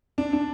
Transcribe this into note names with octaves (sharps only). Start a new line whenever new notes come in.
D4
D4